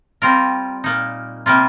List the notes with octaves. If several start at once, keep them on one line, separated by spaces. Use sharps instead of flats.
G3 C4 F4 A#4
A#2 A#3 D#4
C3 G3 A#3 F4